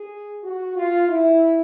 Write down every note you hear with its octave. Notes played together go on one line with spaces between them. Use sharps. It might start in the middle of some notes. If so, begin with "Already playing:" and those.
Already playing: G#4
F#4
F4
E4